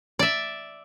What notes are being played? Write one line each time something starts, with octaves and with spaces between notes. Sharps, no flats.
D5 E5